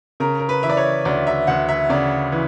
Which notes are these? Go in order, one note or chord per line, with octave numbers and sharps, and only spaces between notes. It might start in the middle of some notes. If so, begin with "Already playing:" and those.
C#3 A#4
A#4
B4
E3 E5
D5
C#5
D2 D5
E5
D2 F#5
E5
C#3 D5
E3